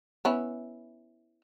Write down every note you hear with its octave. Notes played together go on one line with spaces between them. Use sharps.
B3 C#4 E4